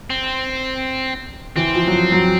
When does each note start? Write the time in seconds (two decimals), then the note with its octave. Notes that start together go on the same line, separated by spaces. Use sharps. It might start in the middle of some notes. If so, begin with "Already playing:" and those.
0.10 C4
1.56 E3 C4
1.75 F3
1.87 F#3
1.94 F3
2.12 F#3